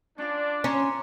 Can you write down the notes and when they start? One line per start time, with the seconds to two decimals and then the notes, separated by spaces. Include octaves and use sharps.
0.18 C#4 D4 F4 F5
0.64 C#4 A#5 C6 D6 C#7